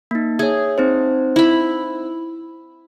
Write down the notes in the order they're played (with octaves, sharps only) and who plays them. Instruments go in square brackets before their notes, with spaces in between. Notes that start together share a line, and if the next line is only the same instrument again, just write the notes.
[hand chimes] A#3 D#4
[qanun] G#4 [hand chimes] C#5 E5
[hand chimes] C4 D#4 C5
[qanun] E4 B5